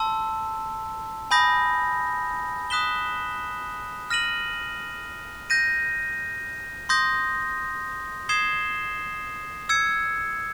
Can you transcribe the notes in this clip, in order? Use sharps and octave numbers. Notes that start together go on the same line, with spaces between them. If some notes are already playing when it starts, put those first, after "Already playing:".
Already playing: A5 C6 E6
G#5 B5 D#6 G6 A#6
D#6 F#6 B6 E7 G7
F6 A#6 D#7 F#7
G6 A#6 D#7
C6 D#6 G6 A#6
D#6 G#6 C7 E7 G7
E6 G#6 C#7